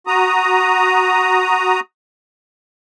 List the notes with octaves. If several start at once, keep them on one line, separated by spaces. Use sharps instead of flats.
F#4 A#5 D#6